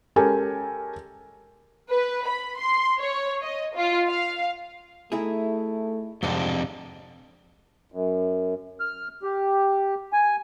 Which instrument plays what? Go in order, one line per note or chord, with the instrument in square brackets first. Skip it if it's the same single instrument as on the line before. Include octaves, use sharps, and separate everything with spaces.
[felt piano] G#3 C#4 G4 A4 A#4 G#5
[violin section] B4
B5
C6
C#5
D#5
F4
F5
[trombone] A3 [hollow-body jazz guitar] D#4 E4 G#4
[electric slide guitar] F2 C3 D4 [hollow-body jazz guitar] G#2 F#5 C6
[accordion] F#2
F6
G4
G#5